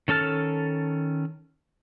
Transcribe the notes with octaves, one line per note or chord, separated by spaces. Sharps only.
D#3 C#4 A4 A5 F6